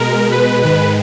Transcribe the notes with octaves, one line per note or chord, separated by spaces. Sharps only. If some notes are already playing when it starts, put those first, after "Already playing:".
Already playing: B2 G#3 A#4
B4
G#2 D#3 G#3 B4